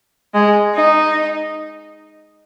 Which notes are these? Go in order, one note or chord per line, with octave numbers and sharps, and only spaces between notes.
G#3
D#4